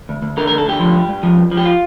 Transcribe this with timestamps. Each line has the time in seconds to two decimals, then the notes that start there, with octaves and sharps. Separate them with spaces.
0.09 D2
0.22 D2
0.37 D3 A#4
0.47 A#4
0.52 D2
0.58 A4
0.66 D3 G4
0.79 F3
0.94 G2
1.09 G2
1.23 F3
1.38 G2
1.52 F3
1.57 G4
1.65 F4